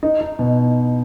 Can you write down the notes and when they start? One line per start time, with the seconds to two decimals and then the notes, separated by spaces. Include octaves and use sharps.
0.03 D#4
0.21 D#4
0.39 B2